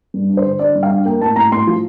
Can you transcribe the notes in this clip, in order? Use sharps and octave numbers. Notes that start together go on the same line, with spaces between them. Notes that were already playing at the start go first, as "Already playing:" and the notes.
G2
D4
C5
D3
D4 D5
G2
F5
D4
A#3 G5
A2 A5
A2 A#5
A2 C6
F3